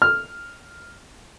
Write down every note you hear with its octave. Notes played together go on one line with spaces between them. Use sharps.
F6